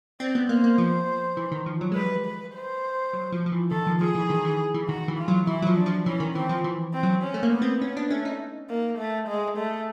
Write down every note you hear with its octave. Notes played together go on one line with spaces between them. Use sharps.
C4 D5
B3
A#3 C5
A#3
F3
E3
D#3
F3
F#3
G#3
G3 B4
B4
C5
F#3
F3
F3
E3
D#3 A4
F3
F3 G#4
E3
D#3
E3
E3
D#3 F#4
E3
F4
F#3
E3 E4
F#3
F3
D4
F3
E3 C#4
D#3
E3 C4
F3
E3
C4
F#3
C#4
A3
A#3
B3
C4
B3 C#4
D4
A3 C#4
D#4
A#3
A3
G#3
A3